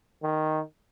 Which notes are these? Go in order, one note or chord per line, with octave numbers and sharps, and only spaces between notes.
D#3